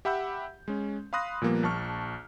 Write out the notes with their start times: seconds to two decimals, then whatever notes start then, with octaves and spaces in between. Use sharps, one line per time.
0.05 G4 E5 F#5 B5 E6 G6
0.68 G#3 C#4
1.13 F5 B5 C6 D#6 F#6 A#6
1.42 A#2 F3 G3 A#3 B3
1.63 A#1 A5 C#6 F6